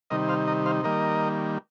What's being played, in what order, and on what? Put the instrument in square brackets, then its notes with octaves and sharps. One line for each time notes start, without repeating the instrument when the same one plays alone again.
[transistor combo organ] C3 D#3 G3 D#4 A#4 D#5
C5 F5
A#4 D#5
C5 F5
D#3 G3 A#3 A#4 D#5